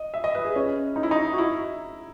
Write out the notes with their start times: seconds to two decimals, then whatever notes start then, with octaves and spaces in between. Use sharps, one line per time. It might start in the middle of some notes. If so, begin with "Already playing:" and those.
Already playing: D#5
0.14 E5
0.24 D#5
0.35 B4
0.45 G#4
0.55 C#4
0.96 D#4
1.03 E4
1.11 D#4
1.33 F#4
1.38 E4